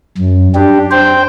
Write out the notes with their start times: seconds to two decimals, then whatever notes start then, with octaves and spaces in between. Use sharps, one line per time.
0.18 F#2
0.55 D4 G4
0.91 C5 G5